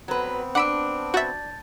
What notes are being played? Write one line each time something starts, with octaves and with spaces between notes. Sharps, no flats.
F#3 B3 C4 B4
D4 F#5 B5 D6 E6 D7
F#4 E5 G6 A6